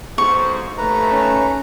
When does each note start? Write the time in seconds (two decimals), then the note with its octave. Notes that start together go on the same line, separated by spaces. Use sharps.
0.18 B1 G#2 C5 C#6
0.78 D#2 A3 B4 A#5
1.12 C#4